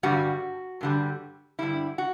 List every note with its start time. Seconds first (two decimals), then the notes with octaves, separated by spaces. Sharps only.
0.03 G2 D3 G3 F#4
0.81 G2 D3 G3
1.59 G2 D3 G3 E4
1.98 F#4